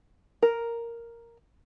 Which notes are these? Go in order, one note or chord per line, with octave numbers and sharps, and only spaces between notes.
A#4